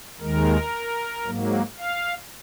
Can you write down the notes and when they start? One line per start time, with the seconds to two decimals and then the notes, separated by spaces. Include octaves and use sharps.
0.20 D#2 D#3 G#3 A#4
1.25 G#2 F#3 A#3
1.78 F5